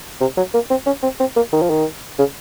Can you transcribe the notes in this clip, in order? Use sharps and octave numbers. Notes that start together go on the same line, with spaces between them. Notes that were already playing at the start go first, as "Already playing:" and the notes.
C3
F#3
A#3
C4
C#4
C4
C4
A#3
D#3
F3
D#3
C#3